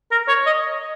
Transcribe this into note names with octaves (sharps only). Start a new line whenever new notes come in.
A#4
C#5
D#5